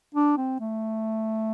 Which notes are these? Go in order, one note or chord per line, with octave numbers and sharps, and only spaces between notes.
D4
C4
A3